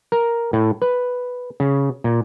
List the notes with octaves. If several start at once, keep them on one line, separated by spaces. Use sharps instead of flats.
A#4
A2
B4
C#3
A#2